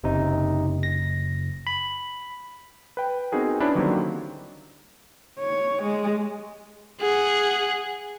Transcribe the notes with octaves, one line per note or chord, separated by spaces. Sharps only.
F#1 C3 D#4
A#6
B5
B4 G5
B3 C4 D#4 F#4 G#4 A#4
C#4 D4 E4 B4 C#5
D3 D#3 F#3 G3 A#3 C4
C#5
G#3
G#4 F#5